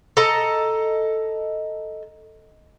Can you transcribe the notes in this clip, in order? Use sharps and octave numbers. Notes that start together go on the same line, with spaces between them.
A4 D#5 A#5